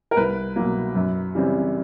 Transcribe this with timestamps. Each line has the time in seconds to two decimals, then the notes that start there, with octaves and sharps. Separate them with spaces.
0.11 A#4
0.17 C2 B4
0.56 B2 F#3 A#3
0.95 F#2
1.35 C#3 E3 G3 C4